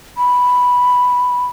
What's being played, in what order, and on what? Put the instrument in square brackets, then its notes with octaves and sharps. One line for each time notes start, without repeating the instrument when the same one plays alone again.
[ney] B5